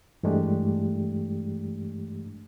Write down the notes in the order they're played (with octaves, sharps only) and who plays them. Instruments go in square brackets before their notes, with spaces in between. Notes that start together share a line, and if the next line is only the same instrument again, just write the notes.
[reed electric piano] G2 E3 G#3 A3 D4 G4